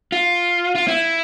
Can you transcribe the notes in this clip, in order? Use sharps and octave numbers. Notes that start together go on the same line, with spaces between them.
F4
F4
E4